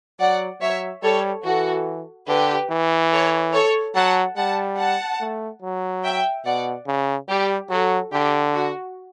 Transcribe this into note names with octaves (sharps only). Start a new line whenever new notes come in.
F#3 D5 F#5
F#3 C#5 E5
G3 A4 C#5
E3 F#4 A4
D3 G4 B4
E3
A4 C#5
A4 C#5
F#3 F#5 A5
G3 F#5 A5
F#5 A5
A3
F#3
E5 G5
B2 D5 F#5
C#3
G3 G4
F#3 F#4 A4
D3 G4
F#4